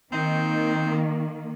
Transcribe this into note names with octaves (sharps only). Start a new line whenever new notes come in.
D#3 A#3 C4 D#4